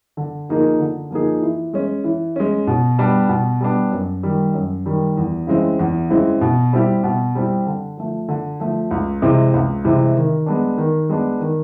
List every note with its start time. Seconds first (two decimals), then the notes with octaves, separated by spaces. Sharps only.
0.17 D3
0.49 F3 A#3 D#4 G#4
0.80 D3
1.11 F3 A#3 D#4 G#4
1.42 E3
1.73 G#3 C#4
2.04 E3
2.36 G#3 C#4
2.67 B2
2.99 G3 B3 D4
3.29 B2
3.61 G3 B3 D4
3.92 F#2
4.23 D#3 G3
4.54 F#2
4.86 D#3 G3
5.17 E2
5.47 C#3 E3 G#3 C4
5.79 E2
6.09 C#3 E3 G#3 C4
6.41 B2
6.73 G3 C4 E4 G4
7.03 B2
7.35 G3 C4 E4 G4
7.67 D3
7.97 F3 A3
8.29 D3
8.60 F3 A3
8.91 C#2
9.22 C3 E3 G#3 C4
9.54 C#2
9.85 C3 E3 G#3 C4
10.15 D#3
10.46 G#3 B3 D4
10.78 D#3
11.09 G#3 B3 D4
11.40 D#3